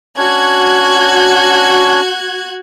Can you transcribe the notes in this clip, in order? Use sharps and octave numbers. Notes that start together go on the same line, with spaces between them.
C#4 D4 F#4 C#5 F#6 G#6